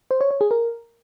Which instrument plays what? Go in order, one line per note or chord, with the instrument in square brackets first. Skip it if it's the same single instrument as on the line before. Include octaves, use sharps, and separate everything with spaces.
[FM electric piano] C5
C#5
C#5
G#4
A#4